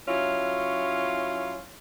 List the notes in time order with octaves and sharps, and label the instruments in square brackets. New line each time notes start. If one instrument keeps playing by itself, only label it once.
[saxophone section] F#3 C#4 E4 F4